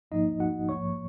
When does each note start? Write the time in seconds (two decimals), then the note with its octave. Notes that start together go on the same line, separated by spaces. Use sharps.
0.11 G#1 G#2 F3 A#3 D#4 D#5
0.40 F#4 F#5
0.69 A#1 G#2 F3 A#3 C#5 C#6